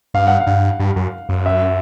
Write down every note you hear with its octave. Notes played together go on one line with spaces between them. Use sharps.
G2 F5
F#5
F5
G2
G2
F#2
F#2
E5